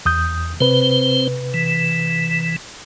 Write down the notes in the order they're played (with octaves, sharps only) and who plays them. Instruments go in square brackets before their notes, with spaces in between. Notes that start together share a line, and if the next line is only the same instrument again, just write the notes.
[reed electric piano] E2 D#6 G6
[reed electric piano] C3 B4 [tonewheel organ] C4 C5
[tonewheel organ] E3